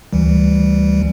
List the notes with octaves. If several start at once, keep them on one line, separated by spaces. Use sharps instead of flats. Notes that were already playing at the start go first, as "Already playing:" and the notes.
D2 E3 G3